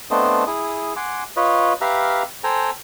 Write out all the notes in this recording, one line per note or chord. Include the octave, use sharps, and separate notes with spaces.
A3 B3 C4 D4 C5 D#5
E4 G#4 D#6
F#5 G#5 C6 D6
F4 B4 C#5 D#5
G4 B4 E5 F5 A#5 F6
A4 C5 G5 G#5 A#5